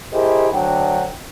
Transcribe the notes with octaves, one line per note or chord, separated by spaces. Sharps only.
E4 G4 G#4 A#4 C5 D#5
D2 F#3 D4 F#5 G5